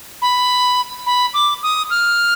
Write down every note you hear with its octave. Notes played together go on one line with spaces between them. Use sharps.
B5
B5
D6
D#6
F6